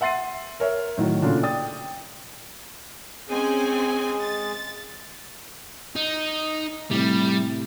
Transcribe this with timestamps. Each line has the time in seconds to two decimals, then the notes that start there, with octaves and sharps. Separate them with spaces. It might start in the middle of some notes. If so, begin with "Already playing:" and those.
0.01 E5 F#5 C6 A6 C7 D#7
0.60 A#4 C#5 E5
0.97 A2 D#3 F#3
1.22 A#2 C#3 D4 F4 F#4 A4
1.43 D5 G5 D#6 A6
3.29 G#3 C4 C#4 G#4 G#5
4.21 A6
5.96 D#4
6.91 A2 C3 G3